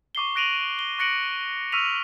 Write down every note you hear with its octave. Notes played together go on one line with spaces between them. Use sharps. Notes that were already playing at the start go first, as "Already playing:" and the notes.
C#6 D6 C7 G7
F#6 A#6 D7 D#7 F7 F#7
G7
C#6 F#6 A#6 C#7 D7 F#7
C#6 E6 F6 B6 D#7 F7